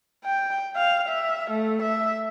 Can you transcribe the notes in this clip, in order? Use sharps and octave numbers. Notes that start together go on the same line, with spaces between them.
G5
F5
E5
A3
E5